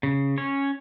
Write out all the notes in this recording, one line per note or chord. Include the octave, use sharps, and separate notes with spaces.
C#3
C#4 C#5